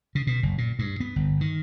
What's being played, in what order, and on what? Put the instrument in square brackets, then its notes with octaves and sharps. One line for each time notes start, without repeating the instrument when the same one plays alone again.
[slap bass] C#3
B2
F#1
A#2
G2
B3
G1
D#3